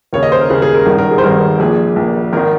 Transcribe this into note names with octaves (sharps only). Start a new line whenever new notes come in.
D#2 C#3 C#5
D#5
C5
A#4
D#2 C#3 G#4
G#4
A#4
G#1 G2 D#3 A#4
A#4
G#4
C5
G#1 G2 D#3 A#4
A#1 A#2 G#4
A#1 A#2
G#1 D#3 A#4